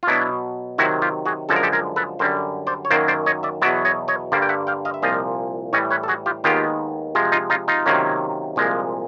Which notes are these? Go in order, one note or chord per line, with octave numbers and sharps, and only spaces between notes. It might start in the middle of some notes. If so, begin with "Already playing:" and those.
F4
B2 F#3 B3 D4 E4
C3 D#3 F#3 E4 F#4
F4 G4
F#4 G#4
F#2 D3 F3 G#3 A4
A#4
G4 A4
G#4 A#4
A4 B4
F#2 D3 G3 A#4 C5
C5 D5
C#5
F#2 D#3 F#3 A#3 C5 D5
C5 D5
C#5 D#5
D5 E5
E2 B2 F#3 B3 D5 E5
C#5 D#5
C#5 D#5
G2 D3 G3 A#3 C5 D5
G5
E5 F#5
F5 G5
D#5 F5
E5
C2 A#2 F3 D#5 F5
A2 E3 G3 C#5 D#5
B4 C#5
A4
F#4 G#4
F4 G4
D#2 D#3 G#3 B3 F4 G4
C3 F3 G#3
D#4 F4
D#4 F4
D#4 F4
C3 D#3 F#3 A#3 C#4
C2 A#2 F3 G#3